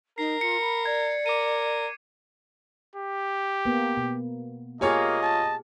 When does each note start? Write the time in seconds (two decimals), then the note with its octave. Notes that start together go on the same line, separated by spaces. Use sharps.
0.18 D#4 A#4 C7
0.41 F4 C#7
0.60 B5
0.85 D5 G#6
1.26 A#4 D6 D#7
2.95 G4
3.65 A#3 B3
3.97 B2
4.81 A#3 F4 G4 G#4 C#5 D#5 G#5
5.23 A5